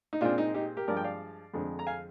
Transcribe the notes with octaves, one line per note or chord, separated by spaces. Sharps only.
D#4
A#2 G#3 C4 D4 F4
D#4
D#4 G4
G4 A#4
G2 F3 G#3 A#4 D5
G5
D5 F5
F2 D3 G#3 C4
A#5
F5 G#5